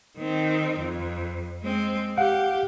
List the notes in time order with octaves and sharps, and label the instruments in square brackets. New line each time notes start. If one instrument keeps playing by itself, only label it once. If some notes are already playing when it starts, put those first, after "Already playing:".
[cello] D#3 C4
F2
G#3 C4
[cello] G4 [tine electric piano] F5 F#5